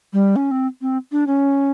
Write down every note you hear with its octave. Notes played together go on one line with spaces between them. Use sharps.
G3
C#4
C4
C4
D4
C#4